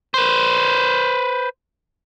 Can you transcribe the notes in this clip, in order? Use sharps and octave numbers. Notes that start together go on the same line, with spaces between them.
B4 C5